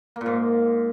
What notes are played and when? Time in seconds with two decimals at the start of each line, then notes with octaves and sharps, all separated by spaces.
0.16 A#3
0.21 A#2
0.26 G#2